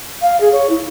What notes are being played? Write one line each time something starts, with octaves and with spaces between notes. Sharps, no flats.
F5
G#4
C#5
E4